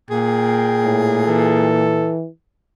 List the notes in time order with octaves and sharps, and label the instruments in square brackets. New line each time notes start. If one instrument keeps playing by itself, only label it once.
[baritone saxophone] A#2 [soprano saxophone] G#4 [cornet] G5
[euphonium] A2
[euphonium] E3 [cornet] A4